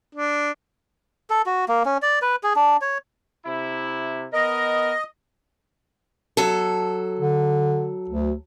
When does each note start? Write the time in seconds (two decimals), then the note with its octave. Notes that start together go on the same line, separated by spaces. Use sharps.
0.15 D4
1.30 A4
1.46 F#4
1.69 A#3
1.85 C#4
2.02 D5
2.22 B4
2.43 G#4
2.56 D4
2.82 C#5
3.45 C3 E4
4.33 B3 A#4 D#5
6.37 F#3 A4
7.19 D3
8.09 D2